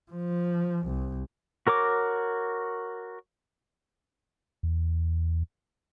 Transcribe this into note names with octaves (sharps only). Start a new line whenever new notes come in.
F3
C2
F#4 A#4 C#5 D6
E2